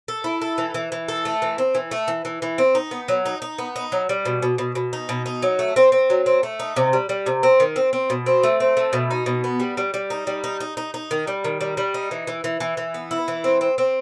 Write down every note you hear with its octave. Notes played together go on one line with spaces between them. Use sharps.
A4
E4
A4
E3
E3
E3
A4
A3
E3
C4
E3
A3
E3
E3
E3
C4
D#4
B3
F#3
D#4
D#4
B3
D#4
F#3
G3
B2
B2
B2
B2
D#4
B2
D#4
F#3
A3
C4
C4
F#3
C4
A3
D#4
C3
G3
G3
C3
C4
D#3
C4
C4
B2
C4
A3
C4
A3
B2
D#4
B2
B3
G3
G3
G3
D#4
G3
D#4
D#4
D#4
D#4
D#3
G3
D#3
G3
G3
D#4
E3
E3
E3
E3
E3
B3
E4
E3
C4
C4
C4